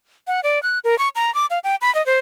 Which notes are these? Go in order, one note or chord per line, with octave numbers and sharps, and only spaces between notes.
F#5
D5
F#6
A#4
C#6
A#5
D6
F5
G5
B5
D#5
C5